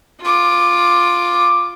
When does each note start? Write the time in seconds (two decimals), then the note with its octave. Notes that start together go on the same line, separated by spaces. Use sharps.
0.21 F4 D6